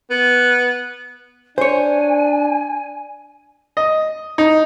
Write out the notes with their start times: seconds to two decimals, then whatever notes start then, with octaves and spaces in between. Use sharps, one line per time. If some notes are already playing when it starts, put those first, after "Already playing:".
0.10 B3
1.58 D4 C5 C#5 G#5
3.77 D#5
4.38 D#4